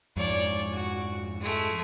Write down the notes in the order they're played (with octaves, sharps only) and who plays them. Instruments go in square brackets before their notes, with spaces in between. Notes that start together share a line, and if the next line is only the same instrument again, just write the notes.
[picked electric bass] F2 G#2 [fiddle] C#5 D5
[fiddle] F#4
G#3 A3